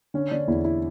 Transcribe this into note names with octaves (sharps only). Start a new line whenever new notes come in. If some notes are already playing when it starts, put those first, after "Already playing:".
D3 C#4
D3 D4
E2 E4
E4